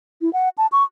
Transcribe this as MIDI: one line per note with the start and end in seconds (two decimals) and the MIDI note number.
0.22 0.32 64
0.33 0.49 78
0.58 0.67 81
0.72 0.83 85